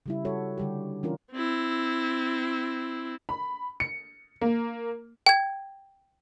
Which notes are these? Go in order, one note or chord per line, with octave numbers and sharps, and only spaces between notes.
C#3 G3 E4
G3 F#4 A4 C#5
D3 G3 G4
E3 C#4 D4 F4 A#4
C4 E4
B5
C#7
A#3
G5 G#6